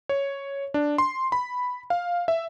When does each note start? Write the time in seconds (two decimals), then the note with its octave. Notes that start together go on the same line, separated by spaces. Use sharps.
0.09 C#5
0.74 D4
0.98 C6
1.32 B5
1.90 F5
2.28 E5